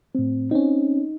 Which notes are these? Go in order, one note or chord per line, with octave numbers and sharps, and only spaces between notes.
A2 C4
C4 C#4 D#4